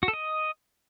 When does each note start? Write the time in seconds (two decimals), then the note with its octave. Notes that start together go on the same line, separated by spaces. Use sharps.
0.03 F#4
0.08 A4
0.13 D#5